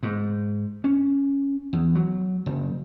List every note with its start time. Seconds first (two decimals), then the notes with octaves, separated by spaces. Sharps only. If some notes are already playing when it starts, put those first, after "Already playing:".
0.03 G#2
0.84 C#4
1.73 E2
1.95 F#3
2.46 F#1